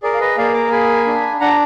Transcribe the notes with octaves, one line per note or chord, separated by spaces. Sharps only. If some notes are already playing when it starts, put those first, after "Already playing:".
G#4 A#4 D5
F5
B4 D#5
A#3 D5 F5
A#5 D6
G#4 G#5 B5
D4
D4 F#5 A#5